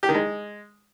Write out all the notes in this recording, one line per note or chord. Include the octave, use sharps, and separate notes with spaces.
G4
D#3
G#3